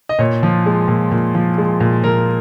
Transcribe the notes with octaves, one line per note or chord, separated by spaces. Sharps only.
D#5
A#2 C#5
F3
G#3
A#2
A#2
F3
G#3
A#2
A#2 A#4